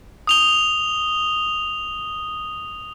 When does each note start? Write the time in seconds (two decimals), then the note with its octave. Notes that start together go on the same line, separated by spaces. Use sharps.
0.27 D#6 F7 G7